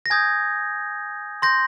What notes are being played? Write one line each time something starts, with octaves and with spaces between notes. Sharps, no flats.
A#6
G#5 D#6 G6 G#6
C6 G6 A#6